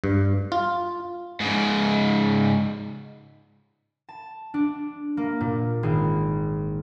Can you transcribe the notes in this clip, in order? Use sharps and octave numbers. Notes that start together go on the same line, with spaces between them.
G2
F4
G#2 C#3
A5
D4
A#3
A#2
G#1 G#4